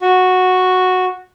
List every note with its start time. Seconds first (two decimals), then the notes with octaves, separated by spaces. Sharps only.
0.02 F#4